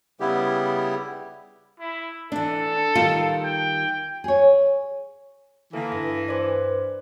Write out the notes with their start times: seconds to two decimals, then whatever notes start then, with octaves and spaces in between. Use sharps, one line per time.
0.20 C#3 G3 B3 E4 G4
1.80 E4
2.32 E3 D4 A4
2.95 D#3 G3 F4
3.44 G5
4.24 G#4 C#5
5.73 D3 E3 A#3 E4 A4
5.92 G2 A#6
6.29 B4 C5 D5